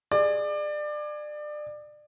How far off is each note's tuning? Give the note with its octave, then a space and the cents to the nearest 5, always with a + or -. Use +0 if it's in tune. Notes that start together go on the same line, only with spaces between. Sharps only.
G#4 +0 D5 +25